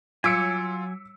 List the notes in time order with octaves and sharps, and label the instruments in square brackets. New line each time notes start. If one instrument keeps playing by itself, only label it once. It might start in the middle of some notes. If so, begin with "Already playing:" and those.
[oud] F#3 [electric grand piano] F4 B6 D7 [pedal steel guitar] G#5 [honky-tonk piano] D6 E6 C#7